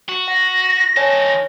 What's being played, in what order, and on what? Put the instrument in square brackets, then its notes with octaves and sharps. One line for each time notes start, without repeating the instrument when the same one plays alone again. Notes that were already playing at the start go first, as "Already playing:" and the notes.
[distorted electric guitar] F#4
[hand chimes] F#5 [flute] A#6
[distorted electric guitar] D#3 A5 [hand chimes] C#5 G#5